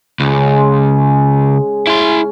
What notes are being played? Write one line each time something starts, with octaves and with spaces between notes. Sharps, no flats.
C#2 C#3
G#3
C#4 E4 C6